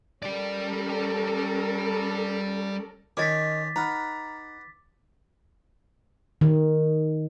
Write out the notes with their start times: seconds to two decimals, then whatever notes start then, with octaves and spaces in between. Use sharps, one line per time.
0.23 G3 C#4 A4 A#4 D5
3.17 D#3 C#4 A#4 C#5 D#5 D6 A6 B6
3.76 D#4 B4 F#5 A#5 F6
6.41 D#3